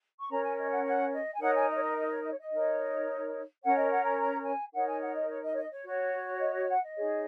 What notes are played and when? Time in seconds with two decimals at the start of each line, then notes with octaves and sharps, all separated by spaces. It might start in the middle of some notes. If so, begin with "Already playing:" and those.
0.19 C#6
0.29 C#4 A#4 C#5 A#5
0.43 G#5
0.57 D#5
0.71 F#5
0.85 F#5
1.13 D#5
1.34 G#5
1.40 D#4 A#4 C#5 F#5
1.55 G#5
1.69 D#5
1.75 C#5
1.83 D#5
1.96 D#5
2.10 C#5
2.23 D#5
2.32 C#5
2.38 D#5
2.51 D#4 A#4 C#5
3.63 C#4 A#4 C#5 F#5
3.76 D#5
3.91 F#5
4.04 A#5
4.18 A#5
4.46 G#5
4.74 D#4 A#4 C#5 F#5
4.87 G#5
5.02 F#5
5.15 D#5
5.28 C#5
5.44 D#5
5.51 C#5
5.57 D#5
5.71 C#5
5.85 F#4 C#5
6.40 D#5
6.53 D#5
6.67 F#5
6.81 D#5
6.96 D#4 G#4 C#5